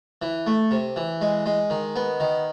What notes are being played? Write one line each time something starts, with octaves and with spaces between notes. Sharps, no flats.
E3
A3
C3
E3
G#3
G#3
D#3
B3
D#3